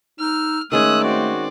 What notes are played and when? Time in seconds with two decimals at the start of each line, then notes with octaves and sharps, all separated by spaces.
0.20 D#4 E6 F6
0.72 D#3 G#3 A3 C#4 D#6 E6 F#6
1.04 C4 F#4 D5